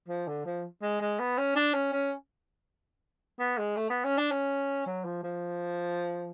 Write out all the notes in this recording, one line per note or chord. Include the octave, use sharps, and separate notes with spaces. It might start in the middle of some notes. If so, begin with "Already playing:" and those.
F3
D3
F3
G#3
G#3
B3
C#4
D4
C#4
C#4
B3
G#3
A3
B3
C#4
D4
C#4
F#3
F3
F3